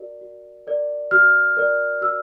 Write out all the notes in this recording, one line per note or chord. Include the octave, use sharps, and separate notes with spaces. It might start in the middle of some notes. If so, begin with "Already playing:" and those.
Already playing: F#4 A#4 D5
F#4
A#4 D5
F#4 F6
A#4 D5
F#4 E6